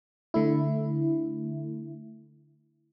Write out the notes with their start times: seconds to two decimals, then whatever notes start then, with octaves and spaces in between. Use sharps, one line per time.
0.34 D3 A3 E4